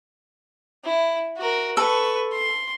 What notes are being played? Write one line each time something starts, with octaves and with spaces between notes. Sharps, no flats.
E4
F#4 A#4
A4 B4 C#6
C6